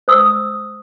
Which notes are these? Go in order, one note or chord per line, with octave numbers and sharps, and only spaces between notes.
C5 D#6 E6